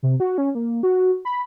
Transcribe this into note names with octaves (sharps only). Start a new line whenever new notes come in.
C3
F#4
C#4
A#3
F#4
B5